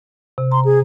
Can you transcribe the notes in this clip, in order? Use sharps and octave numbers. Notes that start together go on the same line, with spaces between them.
C3
A#5 C6
G#4